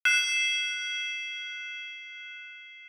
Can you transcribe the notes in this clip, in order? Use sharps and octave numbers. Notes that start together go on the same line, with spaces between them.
F#6 C7 E7